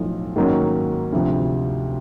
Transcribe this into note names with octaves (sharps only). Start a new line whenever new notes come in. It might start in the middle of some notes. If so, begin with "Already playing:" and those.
Already playing: B1 A2 F3
G#2 D#3 F#3 A#3 C#4
D2 C3 F3